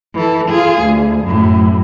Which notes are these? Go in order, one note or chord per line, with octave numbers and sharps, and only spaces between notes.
E3 A4
F4 G#4
D2
F#2 A2